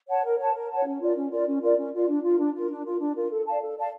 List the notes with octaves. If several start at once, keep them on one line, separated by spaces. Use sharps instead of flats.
C#5 F#5 A5
A#4
C#5 F#5 A5
A#4
C#5 F#5 A5
C#4
F4 A#4 D5
C#4
F4 A#4 D5
C#4
F4 A#4 D5
C#4
F4 A#4 D5
D4
F4 A#4
D4
F4 A#4
D4
F4 A#4
D4
F4 A#4
A4
D5 F5 A5
A4
D5 F5 A5